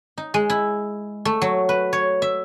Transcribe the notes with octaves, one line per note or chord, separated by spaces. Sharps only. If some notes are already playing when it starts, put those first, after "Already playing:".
D#4
G#3
E4
A3
F#3
B4
C#5
E5